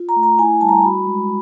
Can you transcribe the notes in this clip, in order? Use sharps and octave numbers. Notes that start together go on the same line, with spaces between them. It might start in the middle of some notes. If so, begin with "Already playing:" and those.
Already playing: F4
A#5
A3
A#5
E4 G#5
G3 A5
A#5
F#4 B5
G#3